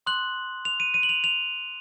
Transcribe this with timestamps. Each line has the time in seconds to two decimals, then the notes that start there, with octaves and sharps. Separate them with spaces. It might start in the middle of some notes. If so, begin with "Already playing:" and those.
0.06 C6 D#6 F#6 F#7
0.65 F7
0.80 D#7
0.94 D#7
1.03 F#7
1.09 F7
1.24 F7